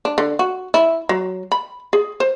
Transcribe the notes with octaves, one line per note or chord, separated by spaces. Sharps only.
D4
D3
F#4
E4
F#3
B5
G#4
C5